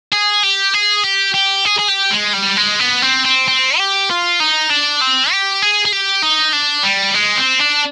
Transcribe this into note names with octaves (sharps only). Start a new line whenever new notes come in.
G#4
G4
G#4
G4
G4
G#4
G#4
G4
G#3
G3
G#3
B3
C4
C4
C4
G4
F4
D#4
D4
C4
G4
G#4
G#4
G4
D#4
D4
G3
G#3
C4
D4